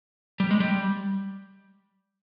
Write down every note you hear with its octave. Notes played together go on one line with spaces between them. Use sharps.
G3
G#3
G3